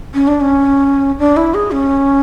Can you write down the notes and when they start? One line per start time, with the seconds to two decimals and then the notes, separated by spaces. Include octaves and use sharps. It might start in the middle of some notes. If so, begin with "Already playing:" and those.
0.14 C#4
0.27 D4
0.41 C#4
1.19 D4
1.37 E4
1.54 G#4
1.71 C#4